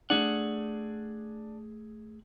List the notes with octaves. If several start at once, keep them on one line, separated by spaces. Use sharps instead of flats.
A3 D4 G#4 F#5